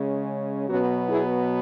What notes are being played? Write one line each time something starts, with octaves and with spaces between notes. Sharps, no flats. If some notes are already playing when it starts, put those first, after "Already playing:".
Already playing: C#3 G#3 C#4
B2 F#3 B3 C#4 F#4
E4 G#4